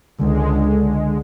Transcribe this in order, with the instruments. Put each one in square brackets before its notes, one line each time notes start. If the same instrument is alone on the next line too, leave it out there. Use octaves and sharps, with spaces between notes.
[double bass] C#2 [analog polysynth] D3 G#3